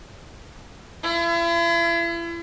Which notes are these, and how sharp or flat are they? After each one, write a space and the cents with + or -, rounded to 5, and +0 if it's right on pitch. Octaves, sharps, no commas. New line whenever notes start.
E4 +40